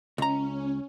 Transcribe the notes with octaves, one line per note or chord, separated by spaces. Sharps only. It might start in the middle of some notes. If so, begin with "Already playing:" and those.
C#2 C#4 A#5